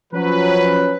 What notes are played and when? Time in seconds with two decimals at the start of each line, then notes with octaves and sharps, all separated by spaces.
0.12 F3 F#3 C#4 B4